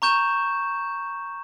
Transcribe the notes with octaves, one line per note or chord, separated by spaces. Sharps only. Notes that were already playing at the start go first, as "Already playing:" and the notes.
A#5 C#6 G6 E7